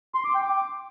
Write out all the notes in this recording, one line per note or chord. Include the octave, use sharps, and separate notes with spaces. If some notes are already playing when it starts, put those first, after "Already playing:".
C6
D6
G5
D6